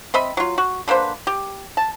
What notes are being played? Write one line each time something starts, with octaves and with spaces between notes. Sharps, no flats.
C4 D#5 E5 B5
F#3 F4
F#4
D3 A#3 B4 C5
G4
A5